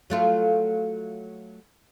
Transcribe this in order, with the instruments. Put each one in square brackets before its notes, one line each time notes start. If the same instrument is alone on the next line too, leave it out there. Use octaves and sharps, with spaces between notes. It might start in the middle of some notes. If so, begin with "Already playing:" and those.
[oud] F#3 A3 F4